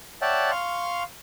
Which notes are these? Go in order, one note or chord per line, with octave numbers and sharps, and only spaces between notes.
C#5 D5 E5 F#5 G5 A5
F5 C6 C#6 F6